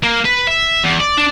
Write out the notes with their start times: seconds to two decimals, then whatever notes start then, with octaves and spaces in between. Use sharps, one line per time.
0.04 A#3
0.25 B4
0.47 E5
0.84 E2
1.00 D5
1.17 D4